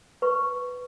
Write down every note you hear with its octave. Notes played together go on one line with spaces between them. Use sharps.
B4 C#6